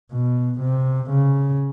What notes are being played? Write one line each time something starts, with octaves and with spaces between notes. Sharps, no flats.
B2
C3
C#3